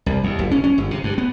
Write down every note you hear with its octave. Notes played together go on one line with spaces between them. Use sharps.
C2
D#2
F#1
C#4
C#4
G1
C3
G2
B3